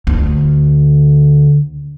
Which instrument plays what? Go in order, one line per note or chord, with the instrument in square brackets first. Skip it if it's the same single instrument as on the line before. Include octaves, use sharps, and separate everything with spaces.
[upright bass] D2 D3